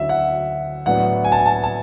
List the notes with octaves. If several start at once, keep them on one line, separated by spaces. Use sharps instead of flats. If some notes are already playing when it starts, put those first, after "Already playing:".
Already playing: D2 D3 F#3 C#4 E4 E5
F#5
A2 F#3 B3 D4 F#5
G#5
A5
G#5
A5
G#5
A5